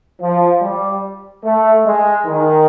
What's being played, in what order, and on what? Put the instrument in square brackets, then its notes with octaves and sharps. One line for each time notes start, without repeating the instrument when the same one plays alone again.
[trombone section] F3
G3
A3
G#3
D#3